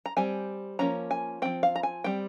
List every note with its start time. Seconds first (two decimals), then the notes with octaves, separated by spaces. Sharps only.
0.06 A#5
0.17 G3 C4 G#5
0.79 F3 A#3 C#4 A#5
1.11 G#5
1.42 F3 C4 G5
1.63 F5
1.76 A#5
1.83 G#5
2.04 G3 C4 G5